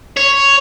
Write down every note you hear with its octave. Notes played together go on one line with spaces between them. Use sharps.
C#5